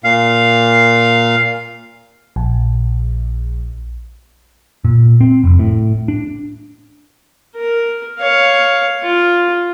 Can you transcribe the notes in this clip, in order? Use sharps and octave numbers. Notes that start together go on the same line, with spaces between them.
A#2 F5
A#1
A#2
C4
F1
A2
D4
A#4
C#5 F5
F4